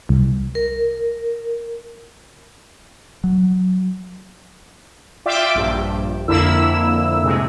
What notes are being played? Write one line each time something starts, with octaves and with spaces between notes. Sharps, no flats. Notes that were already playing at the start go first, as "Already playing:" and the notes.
C2
A#4
F#3
F4 D5 E5 G5 D6
A#1 G2
F2 D3 A#3 E4 E6
A2 C3 G#3